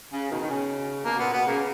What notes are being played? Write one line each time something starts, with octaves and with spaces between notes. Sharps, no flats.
C#3
B2 D#3
D#3
C#3
B2 A#3
A#2 B3
B2 B3
C#3 A#3